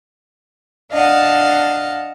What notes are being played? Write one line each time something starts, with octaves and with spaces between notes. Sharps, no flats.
D4 D#5 F5 F#5 A5